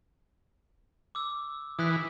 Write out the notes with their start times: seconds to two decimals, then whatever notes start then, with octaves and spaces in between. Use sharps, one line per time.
1.15 D6 E6
1.79 E3 D#6 F#6 B6